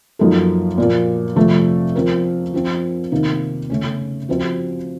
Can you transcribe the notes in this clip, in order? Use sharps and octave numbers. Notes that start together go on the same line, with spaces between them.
F#2 F3 A#3 D#4 A4
A#2 F3 A#3
F2 C3 F3 A3
F3 C4 F4 A#4
F3 C4 F4
C3 D#3 A#3 D#4
C#3 A3 C#4
F3 C4 F#4 C5